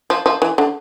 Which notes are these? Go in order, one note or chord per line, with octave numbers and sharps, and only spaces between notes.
F3
F3
E3
D3